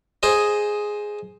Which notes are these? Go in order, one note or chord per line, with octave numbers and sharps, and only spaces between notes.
G#4 C5 D#5